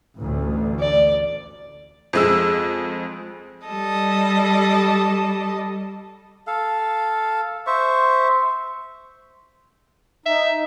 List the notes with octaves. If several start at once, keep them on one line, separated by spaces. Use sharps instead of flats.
A1 D2
D5
F2 G#3 E6
G3 A4 D#5
A4 F5
C5 E5 C#6
D#4 E5